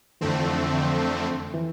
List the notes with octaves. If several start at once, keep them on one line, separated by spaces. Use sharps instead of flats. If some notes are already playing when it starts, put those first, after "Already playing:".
F2 D3 E3 A3 C4
E3